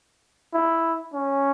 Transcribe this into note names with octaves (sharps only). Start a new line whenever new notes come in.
E4
C#4